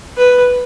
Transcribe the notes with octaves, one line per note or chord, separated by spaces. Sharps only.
B4